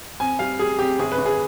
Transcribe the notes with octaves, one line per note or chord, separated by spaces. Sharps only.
F2 G#5
G3 F5
G3 G#4
F2 G4
G1 G#4
B4
G1
G#4